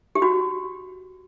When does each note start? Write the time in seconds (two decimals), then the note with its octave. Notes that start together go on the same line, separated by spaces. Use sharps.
0.15 G4
0.22 F#4